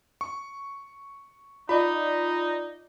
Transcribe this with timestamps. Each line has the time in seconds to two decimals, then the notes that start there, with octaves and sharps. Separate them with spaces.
0.21 C#6
1.69 D#4 F4 D5 D#5 B5